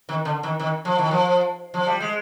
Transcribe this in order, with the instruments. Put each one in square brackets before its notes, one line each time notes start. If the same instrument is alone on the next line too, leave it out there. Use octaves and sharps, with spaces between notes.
[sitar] D#3
D3
D#3
D#3
F3
D#3
F3
F3
G3
G#3